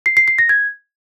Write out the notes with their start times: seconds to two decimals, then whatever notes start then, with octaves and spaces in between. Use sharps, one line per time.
0.06 C7
0.17 C7
0.28 C7
0.38 A#6
0.49 G#6